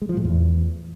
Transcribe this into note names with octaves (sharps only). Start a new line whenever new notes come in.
G#3
F3
A2
E2